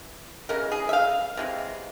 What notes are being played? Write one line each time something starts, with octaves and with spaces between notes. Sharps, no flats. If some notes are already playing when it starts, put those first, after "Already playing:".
Already playing: E3
C#3 E3 G#3 A#4
G#4
E5
F5
C3 E3 G#3